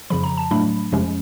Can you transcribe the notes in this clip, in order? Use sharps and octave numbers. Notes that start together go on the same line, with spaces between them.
F2 C#3 F3 B5
A#5
A5
A2 F#3 A3 D4 B5
F2 C3 F3 G#3 C#4